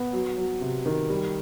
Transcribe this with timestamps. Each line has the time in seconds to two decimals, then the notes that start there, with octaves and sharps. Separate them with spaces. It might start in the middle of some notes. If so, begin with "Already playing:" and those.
Already playing: B3
0.13 F#3
0.37 F#3
0.61 C3
0.86 D#3
1.10 G3